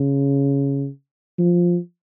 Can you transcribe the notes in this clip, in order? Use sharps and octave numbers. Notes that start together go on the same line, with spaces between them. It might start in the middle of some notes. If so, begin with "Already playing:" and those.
Already playing: C#3
F3